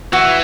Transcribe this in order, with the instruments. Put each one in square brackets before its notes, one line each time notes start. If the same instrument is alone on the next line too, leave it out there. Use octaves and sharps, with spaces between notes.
[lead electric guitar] E3 [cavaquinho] F#4